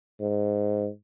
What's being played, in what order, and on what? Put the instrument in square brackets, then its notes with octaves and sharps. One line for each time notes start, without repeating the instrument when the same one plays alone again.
[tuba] G#2